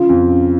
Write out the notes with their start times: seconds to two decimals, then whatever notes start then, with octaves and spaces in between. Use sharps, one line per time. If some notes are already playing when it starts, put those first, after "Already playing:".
Already playing: C#3 F4
0.09 F2
0.30 C#3